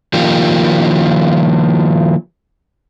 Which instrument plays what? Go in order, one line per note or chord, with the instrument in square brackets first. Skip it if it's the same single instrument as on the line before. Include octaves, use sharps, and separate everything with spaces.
[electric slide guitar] D#3 F3 A#3 F4 G4